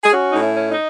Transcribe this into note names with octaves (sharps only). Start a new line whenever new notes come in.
G#4
C#4 F#4
A2 D#4
E4
C#4
D#4